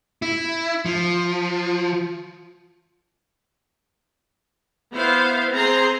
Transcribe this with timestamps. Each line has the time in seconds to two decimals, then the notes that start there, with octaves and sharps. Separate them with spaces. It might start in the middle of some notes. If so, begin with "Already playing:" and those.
0.22 E4
0.85 F3
4.93 B3 E4 C5 F5
5.53 C4 G#4 C5 A#5 C6